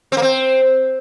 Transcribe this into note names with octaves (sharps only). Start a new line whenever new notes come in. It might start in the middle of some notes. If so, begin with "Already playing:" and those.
C4
A#3
C4